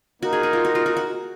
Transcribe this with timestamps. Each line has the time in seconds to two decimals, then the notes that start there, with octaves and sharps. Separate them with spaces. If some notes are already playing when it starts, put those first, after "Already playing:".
0.22 A#3 D#4 F#4 A#4
0.33 G#4
0.43 G#4
0.53 F4
0.65 F#4
0.75 F4
0.86 F#4
0.97 F#4